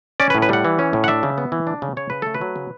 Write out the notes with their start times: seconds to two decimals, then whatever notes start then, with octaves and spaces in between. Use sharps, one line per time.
0.20 C#4 D5
0.30 B4
0.35 A2
0.42 B4
0.49 G3 F#5
0.64 E3
0.79 C#4
0.93 A2
1.04 F#5
1.08 D4 E5
1.23 C#3
1.38 B3
1.52 E3
1.67 D4
1.82 C#3
1.97 C#3 C#5
2.10 C#3 B4
2.22 A3 A4
2.34 B4
2.41 F#3
2.56 C#3